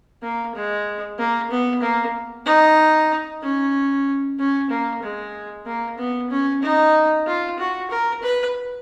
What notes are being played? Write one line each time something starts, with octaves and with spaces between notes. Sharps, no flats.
A#3
G#3
A#3
B3
A#3
D#4
C#4
C#4
A#3
G#3
A#3
B3
C#4
D#4
F4
F#4
A#4
B4